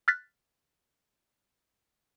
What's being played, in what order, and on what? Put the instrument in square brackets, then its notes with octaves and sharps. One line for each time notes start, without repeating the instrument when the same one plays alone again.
[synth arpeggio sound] F6 F#6 A6 B6